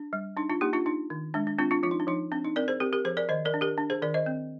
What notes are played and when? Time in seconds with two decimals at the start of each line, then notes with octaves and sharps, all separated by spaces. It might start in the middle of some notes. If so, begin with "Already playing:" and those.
Already playing: D4
0.13 G3
0.37 D4 D#4
0.50 D4 F4
0.61 A#3 D#4 G4
0.73 D4 F4
0.86 D4 D#4
1.10 D#3
1.34 G#3 D4
1.47 D4
1.58 C4 D4 F4
1.71 D4 F4
1.83 F3 F4
1.91 D#4
2.00 D4
2.07 F3 D#4
2.32 C4 D4
2.45 D#4
2.56 C4 A#4 D5
2.68 G#4 C5
2.80 C4 G4 A#4
2.93 G4 A#4
3.05 F3 G#4 C5
3.17 A#4 D5
3.29 D#3 C5 D#5
3.45 A#4 D5
3.54 D4
3.61 G4 A#4
3.78 D4
3.90 G#4 C5
4.02 D#3 A#4 D5
4.14 C5 D#5
4.26 C4